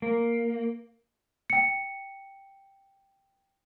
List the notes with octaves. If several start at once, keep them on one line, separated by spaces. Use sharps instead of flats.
A#3
G5 C#7